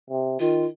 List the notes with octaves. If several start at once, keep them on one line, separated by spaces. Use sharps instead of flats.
C3
D#3 F4